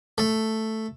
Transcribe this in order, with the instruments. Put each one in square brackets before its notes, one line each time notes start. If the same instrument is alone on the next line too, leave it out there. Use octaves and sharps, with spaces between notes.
[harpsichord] A3